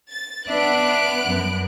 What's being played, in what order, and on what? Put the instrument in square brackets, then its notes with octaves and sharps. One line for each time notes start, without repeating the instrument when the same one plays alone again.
[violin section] A6
[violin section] B3 F#6 D7 [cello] D4 E5
[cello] F#2